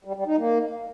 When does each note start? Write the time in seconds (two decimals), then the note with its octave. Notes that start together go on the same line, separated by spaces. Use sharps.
0.05 G3
0.16 G3
0.26 D#4
0.37 A#3